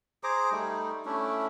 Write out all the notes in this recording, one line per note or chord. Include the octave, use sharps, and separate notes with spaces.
G#4 C5 A#5 D6
G3 A3 D#4
A3 C#4 D4 E4